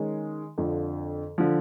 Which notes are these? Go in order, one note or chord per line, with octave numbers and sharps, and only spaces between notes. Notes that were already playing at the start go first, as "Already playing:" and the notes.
Already playing: D#3 G#3 C#4
F2 D3 F3
D3 F3